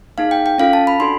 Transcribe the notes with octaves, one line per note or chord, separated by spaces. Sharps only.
A#3 D#4 G#4 F5
G5
G5
C#4 F4 A4 F5
A5
B5
D4 F#4 A4 C6